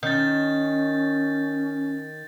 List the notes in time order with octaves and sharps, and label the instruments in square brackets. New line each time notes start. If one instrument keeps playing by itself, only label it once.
[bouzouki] D#3 [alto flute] C#4 [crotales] G6 A6